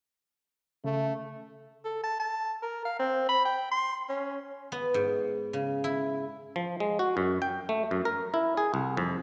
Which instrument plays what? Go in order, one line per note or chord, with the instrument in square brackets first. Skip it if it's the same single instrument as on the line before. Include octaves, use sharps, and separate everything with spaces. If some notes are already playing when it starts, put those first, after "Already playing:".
[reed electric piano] C#3 [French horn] A3
[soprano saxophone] A4
A5
A5
A#4
F5
C4
B5
G5
C6
C#4
[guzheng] B3
G#2
C#3
E4
[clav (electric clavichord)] F3
G#3
F#4
F#2
G5
A3
F#2
A#4
E4
G#4
C2
F2